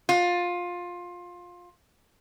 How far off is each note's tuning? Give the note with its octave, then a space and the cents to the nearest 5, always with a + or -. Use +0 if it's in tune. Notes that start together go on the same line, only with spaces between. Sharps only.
F4 +15